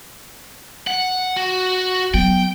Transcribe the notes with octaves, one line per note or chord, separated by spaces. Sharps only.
F#5
F#4
F#3 B3 G5